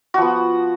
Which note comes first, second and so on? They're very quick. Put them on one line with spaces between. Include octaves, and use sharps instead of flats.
F#4 F3 B3